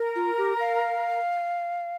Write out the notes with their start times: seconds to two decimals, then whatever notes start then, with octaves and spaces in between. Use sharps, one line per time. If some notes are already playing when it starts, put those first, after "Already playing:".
Already playing: A#4
0.16 F4
0.38 G4
0.60 F5